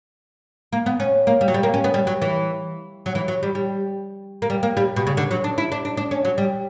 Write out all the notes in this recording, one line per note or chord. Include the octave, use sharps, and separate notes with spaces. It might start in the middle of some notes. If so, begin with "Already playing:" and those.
A#3
B3
C#4
A#3
G3
F#3
G3
A#3
C#4
B3
G3
F#3
E3
F#3
E3
F#3
G3
G3
A#3
G3
A#3
G3
B2
C#3
D3
F#3
D4
E4
D4
D4
D4
C#4
F#3
G3